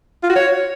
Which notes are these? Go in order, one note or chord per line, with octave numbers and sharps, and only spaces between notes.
F4
F#4
C#5